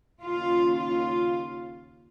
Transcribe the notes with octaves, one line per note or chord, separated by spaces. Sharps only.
D#2 C#3 F4
F4